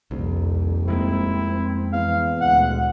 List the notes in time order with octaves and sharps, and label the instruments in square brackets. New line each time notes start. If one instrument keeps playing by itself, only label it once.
[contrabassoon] D#1 [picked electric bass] C2 [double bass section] F2
[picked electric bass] F2 G#3 A#3 [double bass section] C4 [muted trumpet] E4
[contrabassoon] E2 [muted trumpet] F5
[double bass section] D2 A#2 G#3 [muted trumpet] F#5